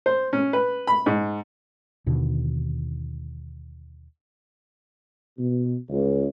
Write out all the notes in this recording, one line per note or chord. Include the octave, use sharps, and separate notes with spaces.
C5
C#4
B4
B5
G#2
D#2 B2 D3 D#3
B2
C#2